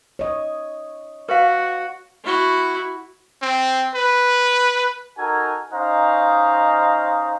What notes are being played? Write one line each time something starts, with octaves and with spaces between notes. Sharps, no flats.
C#5 D#5
F#4 B4 F5
E4 F#4
C4
B4
D#4 F#4 A4 A#4 G#5
C#4 D#4 C5 D#5 F5 A#5